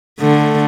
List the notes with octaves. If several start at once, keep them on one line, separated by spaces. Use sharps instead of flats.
D3 A3